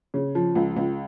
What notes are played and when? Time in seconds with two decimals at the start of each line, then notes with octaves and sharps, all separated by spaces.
0.14 C#3
0.35 F3
0.55 C#2
0.76 C#2